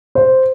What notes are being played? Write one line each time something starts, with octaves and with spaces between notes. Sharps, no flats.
C5